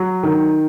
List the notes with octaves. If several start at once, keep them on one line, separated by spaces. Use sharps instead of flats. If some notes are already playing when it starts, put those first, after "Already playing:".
Already playing: F#3
D#3